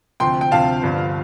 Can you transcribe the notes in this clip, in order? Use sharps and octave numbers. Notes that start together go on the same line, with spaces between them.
D2 C3 F3 G5 C6
G5
D2 C3 F3 F5 A5
G1 G2 D3 F3